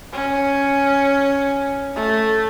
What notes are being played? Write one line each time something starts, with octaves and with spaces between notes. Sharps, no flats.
C#4
A3